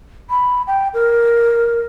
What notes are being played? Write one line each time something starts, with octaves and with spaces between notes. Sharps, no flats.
B5
G5
A#4